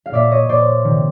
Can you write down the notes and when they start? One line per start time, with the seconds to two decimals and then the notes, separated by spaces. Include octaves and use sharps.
0.06 F5
0.11 A#2 D5 E5
0.31 C#5 D#5
0.48 A#2 C5 D5
0.84 C3 D#3